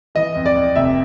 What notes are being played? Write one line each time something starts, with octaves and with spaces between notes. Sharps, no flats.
E3 D#5
F2
D5
F2
F1 E5